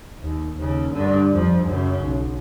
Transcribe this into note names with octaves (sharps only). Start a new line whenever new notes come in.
D#2
D#2 C#3
G2 D3
F2 F3
F#2 C#3
B1